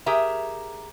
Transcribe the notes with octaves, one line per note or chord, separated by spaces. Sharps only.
G4 G#4 A#4 E5